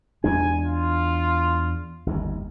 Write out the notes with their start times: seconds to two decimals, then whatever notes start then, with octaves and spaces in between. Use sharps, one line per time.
0.24 E2 G#3 D4 G#5
0.63 F4
2.06 G1 D#2